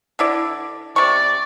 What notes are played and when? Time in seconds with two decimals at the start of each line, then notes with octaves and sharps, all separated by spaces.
0.19 D3 E4 D5
0.96 C3 D5 C#6